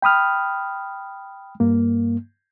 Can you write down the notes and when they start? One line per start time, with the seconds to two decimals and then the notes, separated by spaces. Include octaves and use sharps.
0.02 G5 B5 D#6 F6
1.60 G2 A#3